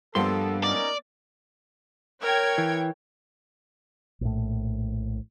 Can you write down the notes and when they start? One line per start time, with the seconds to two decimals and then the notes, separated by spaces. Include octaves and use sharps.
0.15 G2 F3 A#3 B3 A4 C6
0.64 C#4 D#4 A#4 D5
2.21 A#4 C#5 G5 G#6
2.58 E3
4.21 A#1 A2